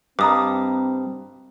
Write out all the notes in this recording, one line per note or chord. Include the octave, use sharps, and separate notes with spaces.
G2 C4 C5 D#5 A#5 D6 D#6